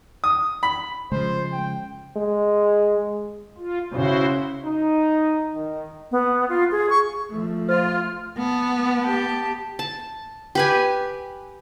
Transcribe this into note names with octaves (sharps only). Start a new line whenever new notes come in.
D#6
B5
C#3 F3 G#3 C5
G5
G#3
F4
C#3 E4 F#4 C5
D#4
D#3
B3
F4
G#4
C#6
F3 A3
F4 C5 F6
B3 A5
G4 A5
A5
G4 B4 G#5